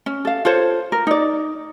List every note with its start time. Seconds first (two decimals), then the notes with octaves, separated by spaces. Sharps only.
0.06 C#4
0.25 A4 F5
0.45 F4 A4 C5 C#5
0.92 A#4
1.07 D#4 D5